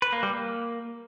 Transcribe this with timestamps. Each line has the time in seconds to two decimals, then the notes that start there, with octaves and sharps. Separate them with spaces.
0.02 B4
0.13 A#3
0.23 G3
0.33 A#3